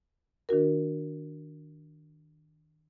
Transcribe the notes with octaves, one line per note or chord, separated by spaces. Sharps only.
D#3 D4 F#4 A#4